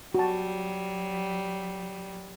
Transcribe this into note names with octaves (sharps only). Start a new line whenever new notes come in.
F#3 G3 F#4 A5